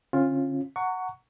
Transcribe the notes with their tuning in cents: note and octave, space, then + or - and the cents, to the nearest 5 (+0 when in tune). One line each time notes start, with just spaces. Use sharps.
D3 -25 C#4 -35 F4 +5
F#5 +0 A#5 -25 C#6 +15